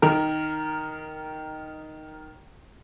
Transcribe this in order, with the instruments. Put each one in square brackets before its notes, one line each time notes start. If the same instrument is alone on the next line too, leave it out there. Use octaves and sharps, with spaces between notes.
[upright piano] D#3 A#4